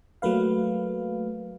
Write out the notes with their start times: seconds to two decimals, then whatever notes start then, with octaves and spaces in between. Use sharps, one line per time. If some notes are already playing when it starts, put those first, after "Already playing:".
0.22 F#3 A3 A#3 B4 F5